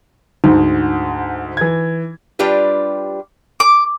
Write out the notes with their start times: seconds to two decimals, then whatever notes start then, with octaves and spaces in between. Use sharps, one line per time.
0.44 D2 G#2 D#4
1.57 E3 G#6
2.39 G3 D4 F4 G4 B4
3.60 D6